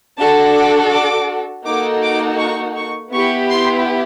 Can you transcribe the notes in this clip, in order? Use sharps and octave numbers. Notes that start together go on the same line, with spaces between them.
D4 F#4 A4 A5
D6
D6
A#3 D#4 F#4 A4 D6
D6
C#6
C#6
B3 E4 G4 C#6
C6